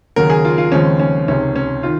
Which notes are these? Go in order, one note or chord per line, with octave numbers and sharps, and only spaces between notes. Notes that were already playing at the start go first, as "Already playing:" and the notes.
D#2 C#3 F#3 A#4
G#4
F4
F4
D#2 C#3 F3 G#3 C4 C#4
C#4
C#2 C3 D#3 C#4
C#4
D#3 F4